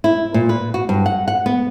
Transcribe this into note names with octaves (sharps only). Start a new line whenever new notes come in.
E4
A#2
B4
F#4
G2
F#5
F#5
B3